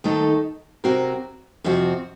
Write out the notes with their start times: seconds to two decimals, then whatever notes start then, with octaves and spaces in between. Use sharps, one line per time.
0.04 D#2 D#3 A3 D#4 A4
0.84 C3 F#3 C4 F#4 A#4
1.64 F2 C3 F3 C4 F#4